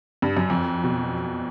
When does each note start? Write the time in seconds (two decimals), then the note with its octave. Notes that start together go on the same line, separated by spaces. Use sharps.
0.22 G2
0.37 F#2
0.50 F2
0.84 B2